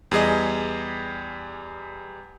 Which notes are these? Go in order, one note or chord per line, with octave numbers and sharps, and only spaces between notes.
E2 G3 G#4 D#5